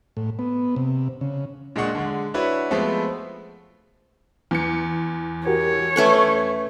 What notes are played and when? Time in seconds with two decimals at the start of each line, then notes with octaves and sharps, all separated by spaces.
0.17 A2
0.39 B3
0.76 C3
1.21 C#3
1.76 A#2 G#3 D4 D#5 F#5 C#6
1.95 D3 G#3
2.34 D4 E4 F#4 B4 C#5
2.71 F3 G#3 A3 B3 C4
4.51 E2 C#7
5.46 F#4 G4 A#4 C#5
5.96 A3 C#4 A4 B4 E5 C#6